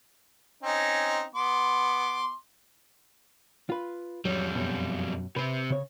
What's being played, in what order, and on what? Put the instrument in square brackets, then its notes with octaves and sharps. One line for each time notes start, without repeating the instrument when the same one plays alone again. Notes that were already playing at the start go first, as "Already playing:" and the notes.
[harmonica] C4 C#4 D#4
B3 C6 D6
[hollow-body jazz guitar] F4 B4
[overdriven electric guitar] F2 G3 [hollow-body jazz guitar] F#3
[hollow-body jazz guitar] F#2 B2
[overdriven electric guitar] C3 C4 [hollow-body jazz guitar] B4
[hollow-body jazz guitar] C#3 C#5